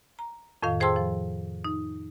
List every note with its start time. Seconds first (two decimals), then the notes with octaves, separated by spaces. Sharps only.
0.19 A#5
0.62 F2 A2 D#3 F5
0.80 G#4 C5 G5 A5 C6 E6
0.96 F3
1.65 D#4